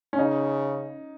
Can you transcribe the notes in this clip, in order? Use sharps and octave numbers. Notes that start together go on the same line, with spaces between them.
C#4
C#3 D#4